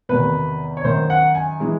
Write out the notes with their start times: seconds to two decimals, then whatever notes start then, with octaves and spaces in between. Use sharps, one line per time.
0.09 E2 C3 D#3 B4
0.77 C#5
0.85 F#2 D#3 F#3 C5
1.10 F#5
1.35 G#5
1.60 E3 G#3